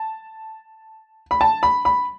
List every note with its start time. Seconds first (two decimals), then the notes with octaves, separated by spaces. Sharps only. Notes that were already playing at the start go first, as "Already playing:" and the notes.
Already playing: A5
1.31 B5
1.41 A5
1.63 B5
1.85 B5